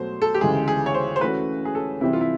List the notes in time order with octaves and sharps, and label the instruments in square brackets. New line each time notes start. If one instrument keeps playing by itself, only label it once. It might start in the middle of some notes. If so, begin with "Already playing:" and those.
Already playing: [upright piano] B2 F#3 A3 [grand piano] C5
[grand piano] A4
G4
[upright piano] D2 C#3 E3 G#3 [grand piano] G#4
[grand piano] G#4
C#5
C5
C5
[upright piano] E3 A3 C#4 F#4 [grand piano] B4
[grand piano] G#4
A4
[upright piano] C3 E3 G3 C4 [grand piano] E4
[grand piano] F4
E4